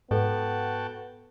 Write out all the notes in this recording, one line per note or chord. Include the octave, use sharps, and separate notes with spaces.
G#2 B3 F#4 A4 B4 G5 A5